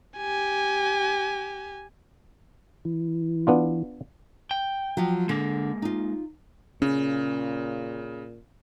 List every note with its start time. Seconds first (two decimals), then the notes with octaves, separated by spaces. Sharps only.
0.18 G4 G#5
2.85 E3
3.47 B3 D4 F4
4.51 G5
4.97 F3 F#3
5.29 D3 G#3 A#3
5.82 D#4 F4
6.82 A#2 C#3 C#4